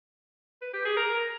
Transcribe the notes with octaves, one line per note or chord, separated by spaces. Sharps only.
B4
G4
G#4
A#4